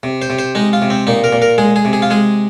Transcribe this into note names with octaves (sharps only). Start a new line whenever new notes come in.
C3
C5
C3
C5
G#3 D#4
F4
C3
C4
A#2 D#4
A#4
A#2
A#4
G#3 G#4
G#4
C3
G#4
F4
G#3 G#4